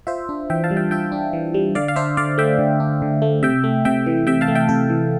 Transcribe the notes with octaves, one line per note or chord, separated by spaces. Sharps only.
F4 C5 E5
D4
E3 E5 G5
F5 A5
G3
E5 G5
F4 E5 G5
D4
E3
G3
D3 D5 F5
F5
D4 C5 E5
D3 D5 F5
A3 E5 G5
D3
D4
D3
A3
C3 E5 G5
A3
C3 E5 G5
E3
C3 E5 G5
F5 A5
A3
E5 G5
C3 A4
E3